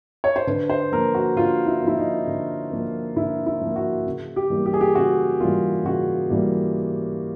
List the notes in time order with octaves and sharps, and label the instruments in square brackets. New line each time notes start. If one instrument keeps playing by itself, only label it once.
[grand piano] C#5
C5
D3 B4
C5
F3 A#3 A#4
F#4
D3 F4
E4
F3 A#3 E4
D#4
D3
F3 A#3
D3 E4
E4
F3 A#3
F#4
C#3
G4
E3 G3 A#3
G4
G#4
G4
C#3 F#4
E3 G3 A#3 F4
C#3 F#4
E3 G3 A#3